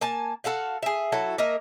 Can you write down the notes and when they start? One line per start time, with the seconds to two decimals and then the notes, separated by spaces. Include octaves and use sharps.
0.01 A#3 G#5 A5
0.44 F#4 A4 F5 F#5
0.83 G#4 E5
1.12 F#3 E4 F#4 A4
1.38 A#3 A#4 D#5 E5